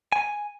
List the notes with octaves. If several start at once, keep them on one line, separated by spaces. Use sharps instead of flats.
G#5